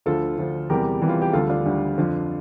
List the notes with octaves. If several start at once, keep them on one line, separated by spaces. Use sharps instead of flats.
D2 D3 F3 F4 A4
D2 D3 F3
E2 C3 E3 G3 G4 A#4
E2 C3 E3 G3
F4
G4
D2 D3 G3 F4 A4
D4 F4
D2 D3 G3
F2 D3 F3